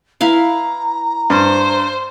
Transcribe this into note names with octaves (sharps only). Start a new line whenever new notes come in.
E4 B4 F5 A#5
G2 C5